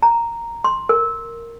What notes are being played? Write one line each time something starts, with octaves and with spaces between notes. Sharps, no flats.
A#5
C6
A#4